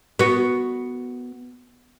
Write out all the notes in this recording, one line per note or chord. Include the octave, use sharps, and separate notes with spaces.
B3 F#4